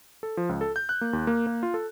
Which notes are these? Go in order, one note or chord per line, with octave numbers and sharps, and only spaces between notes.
A4
F3
C#2
A4
G6
F#6
A#3
D#2
A#3
A#3
F4
A4